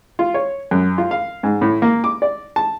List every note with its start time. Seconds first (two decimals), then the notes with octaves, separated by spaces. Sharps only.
0.19 F4
0.34 C#5
0.71 F#2
0.98 F4
1.11 F5
1.43 G#2
1.62 A2
1.82 A#3
2.04 D6
2.22 D5
2.56 A5